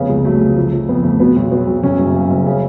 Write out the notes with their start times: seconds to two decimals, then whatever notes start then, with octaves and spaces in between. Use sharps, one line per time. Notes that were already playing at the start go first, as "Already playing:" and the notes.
Already playing: F1 C#3 B3
0.09 C#2
0.25 F#3 A3
0.41 C#2
0.57 F3
0.73 F3
0.89 F2 B3
1.03 F2 A3
1.20 B2 B3
1.36 B1
1.51 F#3 B3
1.67 B1
1.83 F#2 C#4
1.98 F#1
2.15 C#3
2.30 F#1
2.46 C#3